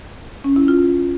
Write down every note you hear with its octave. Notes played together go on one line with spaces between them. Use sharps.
C#4
E4
F4